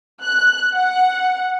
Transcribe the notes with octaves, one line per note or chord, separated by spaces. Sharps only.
F#6
F#5